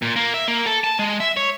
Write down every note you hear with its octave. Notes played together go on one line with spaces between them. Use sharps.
A#2
A#3
E5
A#3
A4
A5
G#3
E5
C#5